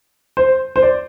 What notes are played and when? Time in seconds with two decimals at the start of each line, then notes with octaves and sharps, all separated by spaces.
0.37 C5
0.76 C5
0.83 D5